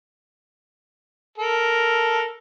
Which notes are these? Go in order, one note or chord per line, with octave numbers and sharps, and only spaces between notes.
A4 A#4